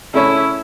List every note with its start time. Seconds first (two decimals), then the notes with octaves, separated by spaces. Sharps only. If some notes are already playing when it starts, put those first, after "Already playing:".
0.14 C#3 A3 C#4 E4